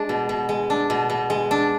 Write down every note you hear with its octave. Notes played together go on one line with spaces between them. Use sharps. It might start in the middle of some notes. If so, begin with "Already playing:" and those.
Already playing: G#3 D4
B2
B2
G#3
D4
B2
B2
G#3
D4